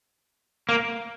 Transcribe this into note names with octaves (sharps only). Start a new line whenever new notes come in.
A#3